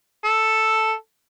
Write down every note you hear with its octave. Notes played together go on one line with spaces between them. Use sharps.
A4